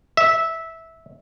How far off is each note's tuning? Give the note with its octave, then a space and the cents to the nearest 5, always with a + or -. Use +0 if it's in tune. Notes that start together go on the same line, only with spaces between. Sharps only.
E5 -15